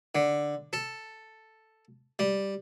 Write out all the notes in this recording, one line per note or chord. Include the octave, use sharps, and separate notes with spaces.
D3
A4
G3